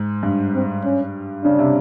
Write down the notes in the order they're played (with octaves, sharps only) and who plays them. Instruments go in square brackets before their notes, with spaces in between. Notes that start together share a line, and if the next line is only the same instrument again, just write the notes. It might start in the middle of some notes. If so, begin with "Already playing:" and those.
Already playing: [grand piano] G#2
G2
[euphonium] C4
C#4
[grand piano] C#3 [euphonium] D4
[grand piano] C3